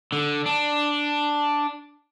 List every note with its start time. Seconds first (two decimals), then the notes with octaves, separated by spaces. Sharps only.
0.12 D3
0.46 D4